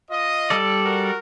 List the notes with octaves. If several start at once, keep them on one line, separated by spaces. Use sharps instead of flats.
F4 D#5
G3 A4 D5
F#4 A#4